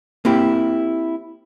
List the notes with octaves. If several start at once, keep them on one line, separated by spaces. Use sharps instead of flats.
A#3 C4 E4 G4